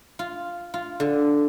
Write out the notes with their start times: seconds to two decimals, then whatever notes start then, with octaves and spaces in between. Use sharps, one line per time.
0.19 F4
0.74 F4
1.00 D3